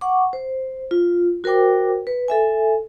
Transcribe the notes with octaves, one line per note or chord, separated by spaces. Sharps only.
F#5 C#6 D6
C5
F4
F#4 A#4 C5 G5 D6
B4
A4 E5 G#5